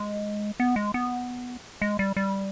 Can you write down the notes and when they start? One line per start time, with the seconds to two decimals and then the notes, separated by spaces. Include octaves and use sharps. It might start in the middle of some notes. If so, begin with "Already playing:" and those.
Already playing: G#3
0.60 B3
0.76 G#3
0.94 B3
1.82 G#3
1.99 G3
2.17 G3